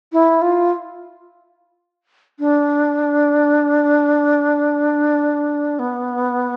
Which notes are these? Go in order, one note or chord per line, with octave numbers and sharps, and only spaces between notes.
E4
F4
D4
B3